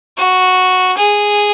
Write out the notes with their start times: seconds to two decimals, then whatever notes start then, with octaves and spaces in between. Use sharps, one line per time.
0.17 F#4
0.97 G#4